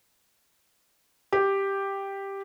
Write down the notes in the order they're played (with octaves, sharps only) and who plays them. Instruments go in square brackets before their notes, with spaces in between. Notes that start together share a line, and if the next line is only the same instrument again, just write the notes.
[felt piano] G4